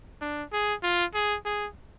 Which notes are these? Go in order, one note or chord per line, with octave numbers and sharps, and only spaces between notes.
D4
G#4
F4
G#4
G#4